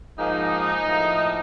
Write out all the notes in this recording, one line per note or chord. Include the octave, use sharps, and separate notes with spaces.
G#2 F3 A#3 D#4
A2 F3 A#3